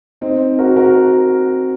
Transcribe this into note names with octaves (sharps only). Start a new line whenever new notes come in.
C4 D#4
F#4 A#4
F#4 A#4